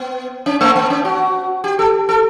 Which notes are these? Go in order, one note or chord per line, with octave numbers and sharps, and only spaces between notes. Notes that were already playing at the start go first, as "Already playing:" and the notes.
Already playing: B3
C#4
A3
B3
C#4
F#4
G4
A4
A4